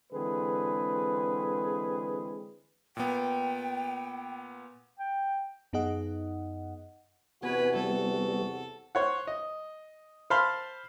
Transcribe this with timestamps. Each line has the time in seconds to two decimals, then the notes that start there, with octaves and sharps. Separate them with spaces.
0.13 D3 E3 G#3 C4 G#4 B4
2.97 A#2 B3 G5
4.99 G5
5.73 F#2 B3 D#4 G#4 D#5 F#5
7.43 E2 C3 B3 F#4 B4 G#5
7.76 G3 B3 A4
8.95 C5 C#5 F#5
9.27 D#5
10.30 C5 F5 A5 B5 C6